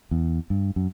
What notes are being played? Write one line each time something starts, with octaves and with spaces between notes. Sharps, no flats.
E2
G2
F#2